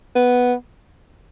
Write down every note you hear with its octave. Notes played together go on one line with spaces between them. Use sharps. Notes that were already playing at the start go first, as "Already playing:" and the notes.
B3